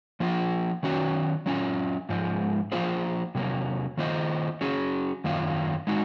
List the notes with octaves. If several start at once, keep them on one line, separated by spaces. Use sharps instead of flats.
F3 A#3 F4
D#3 F#3 C#4 F#4
F#3 C#4 F4
G#2 F3 G#3
F3 A#3 F4 G#4 C5
C3 F#3 A#3
D#3 A#3 F4 C5 D#5
F#3 C#4 G#4
F#2 D#3 A#3 F4
G#3 D#4 F#4